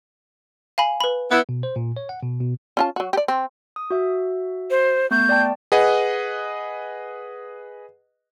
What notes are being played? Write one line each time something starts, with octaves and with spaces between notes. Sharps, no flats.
F5 G#5 B5
B4 B5
B3 E4
B2
C5
A#2
C#5
F#5
B2
B2
C#4 F4 A5
F#3 F#4
G4 D5
C4
D#6
F#4 E5
C5
A3 B3 C#6 G6
D5 G5 A5
G#4 B4 D#5 F#5